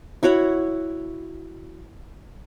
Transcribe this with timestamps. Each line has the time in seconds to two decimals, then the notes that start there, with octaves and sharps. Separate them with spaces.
0.23 E4 F#4 C#5 F#5